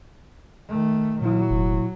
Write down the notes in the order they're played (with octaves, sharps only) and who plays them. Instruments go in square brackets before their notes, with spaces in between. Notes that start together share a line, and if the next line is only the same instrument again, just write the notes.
[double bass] D#3 A3
[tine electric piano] A#2 E4 [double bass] F#3
[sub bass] F1